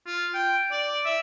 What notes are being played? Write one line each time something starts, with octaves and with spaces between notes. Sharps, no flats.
F4
G5
D5
E5